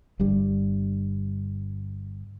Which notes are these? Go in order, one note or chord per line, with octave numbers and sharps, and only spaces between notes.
G1 G2 G3